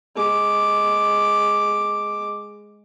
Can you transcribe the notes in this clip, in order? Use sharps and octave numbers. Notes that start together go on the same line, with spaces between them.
G#3 D6